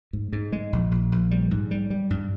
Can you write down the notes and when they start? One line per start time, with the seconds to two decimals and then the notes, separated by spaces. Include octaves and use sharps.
0.13 G#2
0.33 G#2
0.52 G#3
0.73 A#1
0.91 A#1
1.12 A#1
1.31 G3
1.51 G#2
1.71 G3
1.90 G3
2.10 G2